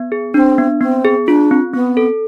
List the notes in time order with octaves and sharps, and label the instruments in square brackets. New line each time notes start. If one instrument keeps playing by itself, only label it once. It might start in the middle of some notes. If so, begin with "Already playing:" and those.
Already playing: [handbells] B3
G#4
[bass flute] C4 [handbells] D4
[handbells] B3
[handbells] B3 [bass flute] C4
[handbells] G#4
[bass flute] D4 [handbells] F4
[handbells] C4
[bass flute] B3 [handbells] C4
[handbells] A4